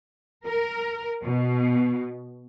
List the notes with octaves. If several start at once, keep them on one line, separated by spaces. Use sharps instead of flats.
A#4
B2